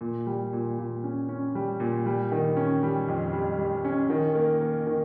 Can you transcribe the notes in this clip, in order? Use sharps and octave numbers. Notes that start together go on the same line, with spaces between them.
A#2
G3
A#2
A#2
C#4
C#4
G3
A#2
G3
D#3
C#4
G3
F2
G3
G3
C#4
D#3
A#3
A#3
D#3